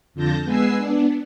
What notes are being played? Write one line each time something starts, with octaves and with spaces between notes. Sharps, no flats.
F2 D3 F4 A5 G6 A#6
G#3 B3 B4 G#5 E6 C7
B3 D4